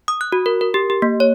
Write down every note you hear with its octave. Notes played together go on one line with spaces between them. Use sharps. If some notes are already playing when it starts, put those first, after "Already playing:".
D#6
F#6
F#4
A#4
A#4
G4
G4
A#3
C#5